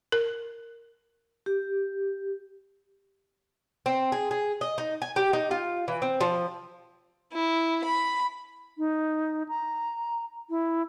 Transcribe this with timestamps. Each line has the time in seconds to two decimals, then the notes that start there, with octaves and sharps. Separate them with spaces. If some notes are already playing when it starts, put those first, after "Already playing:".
0.12 A#4
1.46 G4
3.86 C4
4.12 G#4
4.31 G#4
4.61 D#5
4.78 D#4
5.02 G#5
5.16 G4
5.33 D#4
5.51 F4
5.88 E3
6.02 C4
6.21 F3
7.32 E4
7.84 B5
8.78 D#4
9.48 A#5
10.50 E4